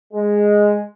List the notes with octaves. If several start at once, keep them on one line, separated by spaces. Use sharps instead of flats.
G#3